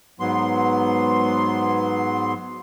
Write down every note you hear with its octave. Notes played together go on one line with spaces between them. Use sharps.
G#2 F#3 B3 C6